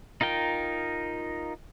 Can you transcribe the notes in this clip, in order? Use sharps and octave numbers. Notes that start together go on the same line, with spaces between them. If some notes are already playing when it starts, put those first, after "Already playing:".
D#4 F4 A#4 G5